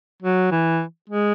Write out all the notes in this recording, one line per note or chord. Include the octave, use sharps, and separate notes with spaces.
F#3
E3
G#3